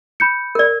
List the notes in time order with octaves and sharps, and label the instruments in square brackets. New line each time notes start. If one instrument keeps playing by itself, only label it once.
[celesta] B5 G6 C#7
[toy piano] A#4 D5